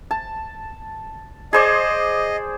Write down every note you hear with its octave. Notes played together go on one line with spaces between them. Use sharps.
A5
G#4 C5 D5 D#5